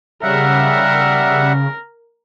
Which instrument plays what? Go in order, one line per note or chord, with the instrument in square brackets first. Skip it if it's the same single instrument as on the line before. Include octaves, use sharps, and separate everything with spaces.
[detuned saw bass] C#3 [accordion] G3 E5 F#5 [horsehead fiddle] A#4